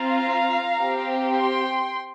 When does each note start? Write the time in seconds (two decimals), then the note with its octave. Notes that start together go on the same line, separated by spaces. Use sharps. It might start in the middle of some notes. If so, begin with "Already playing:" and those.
Already playing: C4 F4 F5 A#5
0.80 C4 G4
1.35 G5 C6